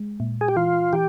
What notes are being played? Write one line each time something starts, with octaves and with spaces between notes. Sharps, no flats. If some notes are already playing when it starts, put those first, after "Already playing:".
Already playing: G#3
A#2
G#4
G4
E3 F4
E3 G4